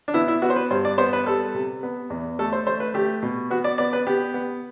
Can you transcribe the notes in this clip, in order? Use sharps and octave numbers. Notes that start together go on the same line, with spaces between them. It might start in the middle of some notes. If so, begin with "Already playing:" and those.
D4
B3 E4
E4
B3 F#4
C5
B4
G2 C5
D5
B3 C5
B4
G3 A4
C3
B3
E2
A3 A4
C5
A3 C5
B4
A3 G4
B2
B3 F#4
D5
B3 D5
B4
B3 G4
B3